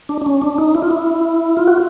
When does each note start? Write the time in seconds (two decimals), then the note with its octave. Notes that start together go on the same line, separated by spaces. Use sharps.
0.09 D4
0.21 D4
0.26 C#4
0.42 D4
0.58 D#4
0.75 E4
0.82 F4
0.91 E4
1.57 F4
1.68 F#4